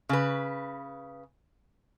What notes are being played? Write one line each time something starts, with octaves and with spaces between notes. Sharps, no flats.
C#3 B4